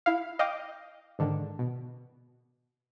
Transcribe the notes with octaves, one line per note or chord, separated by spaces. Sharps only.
E4 F5
D#5 F5 G5 D6
G#2 D3 D#3
B2